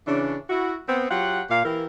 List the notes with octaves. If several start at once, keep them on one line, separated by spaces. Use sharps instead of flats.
C#3 E3 C#4 D4
E4 F#4
B3 C4
F#3 F4 G4 F#5
A#2 F5
E3 E4 G4 A#4